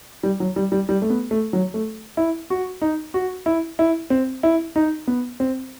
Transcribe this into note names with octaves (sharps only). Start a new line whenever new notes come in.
G3
F#3
G3
G3
G3
A3
B3
A3
F#3
A3
E4
F#4
D#4
F#4
E4
E4
C4
E4
D#4
B3
C4